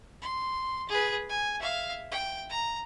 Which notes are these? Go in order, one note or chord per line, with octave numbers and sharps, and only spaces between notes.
C6
G#4 B4
G#5
E5 F5
G5
A#5